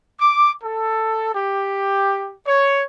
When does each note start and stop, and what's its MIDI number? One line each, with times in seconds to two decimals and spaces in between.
0.18 0.51 86
0.63 1.33 69
1.33 2.32 67
2.46 2.82 73